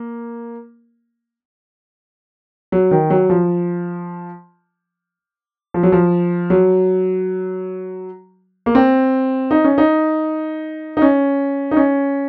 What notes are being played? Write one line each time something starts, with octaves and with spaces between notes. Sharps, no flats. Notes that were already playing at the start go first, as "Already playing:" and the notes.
Already playing: A#3
F#3
D#3
F#3
F3
F3
F#3
F3
F#3
A#3
C4
D#4
C#4
D#4
D#4
C#4
D#4
C#4